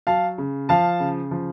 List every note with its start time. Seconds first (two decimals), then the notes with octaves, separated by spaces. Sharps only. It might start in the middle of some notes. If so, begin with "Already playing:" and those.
0.07 F#3 F5 A5
0.38 C#3
0.69 F3 F5 A5
1.00 C#3
1.31 F3